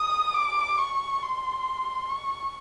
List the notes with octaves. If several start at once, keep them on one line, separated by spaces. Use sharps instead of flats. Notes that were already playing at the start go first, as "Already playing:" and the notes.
Already playing: D#6
D6
C#6
C6
C#6